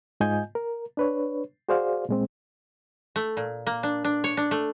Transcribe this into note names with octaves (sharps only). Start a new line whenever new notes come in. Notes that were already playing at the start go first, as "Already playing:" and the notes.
G#2 F4 D#5 G#5 G6
A#4
D4 B4 C#5
F#4 G#4 C5 D5 F5
A#2 G#3 C4
A3
A#2
A#3
D4
D4
C#5
D4
A3